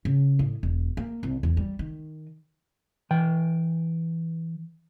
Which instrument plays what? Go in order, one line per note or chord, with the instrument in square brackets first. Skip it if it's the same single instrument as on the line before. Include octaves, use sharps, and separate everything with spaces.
[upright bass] C#3
A2
E1
A#3
C2
E2
G3
D#3
[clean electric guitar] E3 G5